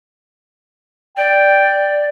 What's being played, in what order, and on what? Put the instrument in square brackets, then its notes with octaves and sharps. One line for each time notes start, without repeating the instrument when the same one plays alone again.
[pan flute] D5 [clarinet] G5